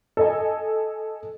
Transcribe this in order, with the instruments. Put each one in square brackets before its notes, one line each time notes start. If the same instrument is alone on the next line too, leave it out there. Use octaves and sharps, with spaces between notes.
[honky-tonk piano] A4 D#5 G#5